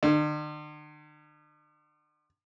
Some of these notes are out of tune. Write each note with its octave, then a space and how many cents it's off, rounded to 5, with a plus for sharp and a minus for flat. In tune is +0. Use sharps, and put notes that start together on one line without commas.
D3 +45